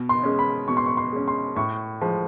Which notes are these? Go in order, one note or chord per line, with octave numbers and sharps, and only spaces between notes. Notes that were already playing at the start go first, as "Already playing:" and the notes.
Already playing: B2
C6
G#3 C#4
B5
B2 C#6
C6
C#6
C6
G#3 C#4
C6
A2 C#6
F3 G#3